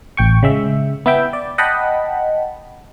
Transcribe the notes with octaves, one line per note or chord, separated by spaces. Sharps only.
A1 G5 C#6
C#3 G#3 E5
B3 E4 E5 G5
D5
D#5 F#5 G5 A5 B5